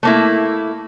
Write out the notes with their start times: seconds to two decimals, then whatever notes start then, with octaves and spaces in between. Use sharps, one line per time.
0.03 A3 A#3 E4